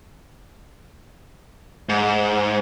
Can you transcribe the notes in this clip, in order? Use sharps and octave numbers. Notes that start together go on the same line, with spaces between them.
G#2